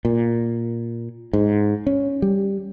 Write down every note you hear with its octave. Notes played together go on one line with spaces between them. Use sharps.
A#2
G#2
C#4
G3